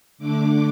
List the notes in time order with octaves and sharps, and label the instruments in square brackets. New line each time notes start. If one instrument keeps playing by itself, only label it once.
[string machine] D3 A3 D4 D6